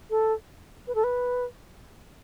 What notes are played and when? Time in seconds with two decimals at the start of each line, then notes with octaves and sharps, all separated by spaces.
0.10 A4
0.87 B4
0.95 A4
1.04 B4